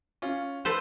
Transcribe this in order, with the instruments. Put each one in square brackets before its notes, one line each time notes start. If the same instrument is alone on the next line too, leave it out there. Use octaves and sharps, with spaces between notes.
[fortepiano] C#4 F4
[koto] A4 B4 C5